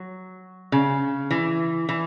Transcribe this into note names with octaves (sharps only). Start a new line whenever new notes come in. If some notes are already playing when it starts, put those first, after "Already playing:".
Already playing: F#3
C#3
E3
E3